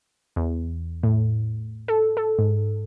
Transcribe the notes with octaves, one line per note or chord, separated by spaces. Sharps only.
E2
A2
A4
A4
G#2